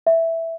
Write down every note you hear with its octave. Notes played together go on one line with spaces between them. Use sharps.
E5